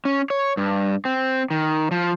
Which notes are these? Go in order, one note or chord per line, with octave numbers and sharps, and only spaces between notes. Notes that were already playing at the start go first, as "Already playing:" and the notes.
C#4
C#5
G2
C4
D#3
F3